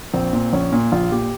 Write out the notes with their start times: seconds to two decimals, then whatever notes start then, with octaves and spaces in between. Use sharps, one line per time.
0.13 A#1 C4
0.33 A#2
0.53 A#1 C#4
0.72 A#2
0.92 A#1 F4
1.12 A#2 G4